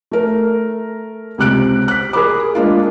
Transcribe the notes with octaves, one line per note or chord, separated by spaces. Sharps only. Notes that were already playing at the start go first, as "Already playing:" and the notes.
A3 A#4
C#2 C3 F#6 D7
F#6 B6
G#4 A#4 B5 D6
G#3 A#3 D4 F4